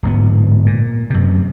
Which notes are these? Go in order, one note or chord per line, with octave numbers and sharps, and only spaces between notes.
D1 G#2 B3
A#2
F#2 C3